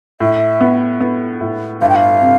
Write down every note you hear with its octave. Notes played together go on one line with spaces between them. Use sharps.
A2 E5
B3
B3
A2
G1 F5
G5
F5
C3